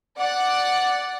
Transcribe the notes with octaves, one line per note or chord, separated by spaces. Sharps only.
D5 F#5